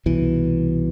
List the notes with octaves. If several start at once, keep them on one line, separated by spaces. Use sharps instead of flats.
C2 B2 E3